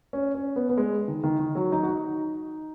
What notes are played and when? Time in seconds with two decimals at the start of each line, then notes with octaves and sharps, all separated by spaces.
0.13 C#4
0.35 C#4
0.56 B3
0.69 B3
0.77 G#3
1.08 D#3
1.24 D#3
1.39 D#3
1.55 F#3
1.72 D#4
1.83 F#4
1.88 D#4